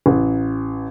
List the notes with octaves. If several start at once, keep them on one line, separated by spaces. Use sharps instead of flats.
A1